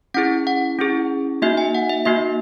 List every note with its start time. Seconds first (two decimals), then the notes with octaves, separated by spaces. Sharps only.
0.14 C#4 E4 G#4 F#5
0.47 F#5
0.79 C#4 E4 G#4
1.42 A#3 D#4 F#4 E5
1.57 G#5
1.75 F#5
1.89 E5
2.05 A#3 D#4 F#4 E5